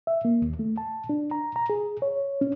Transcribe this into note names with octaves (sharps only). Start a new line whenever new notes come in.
E5
A#3
D#2
A3
A5
D4
A#5
A#5
G#4
C#5
C#4